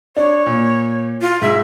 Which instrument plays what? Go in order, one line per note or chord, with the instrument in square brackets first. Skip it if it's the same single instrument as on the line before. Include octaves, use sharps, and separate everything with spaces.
[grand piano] D4 [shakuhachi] C#5
[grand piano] A#2
[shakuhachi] F4
[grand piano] G#2 [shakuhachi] E5